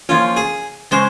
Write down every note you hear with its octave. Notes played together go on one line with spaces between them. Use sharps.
F3 A#3 C#4 F4
G#4
C#3 G#3 C#4 C5